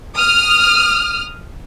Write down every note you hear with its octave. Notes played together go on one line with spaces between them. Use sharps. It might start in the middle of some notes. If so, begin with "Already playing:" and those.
D#6 F6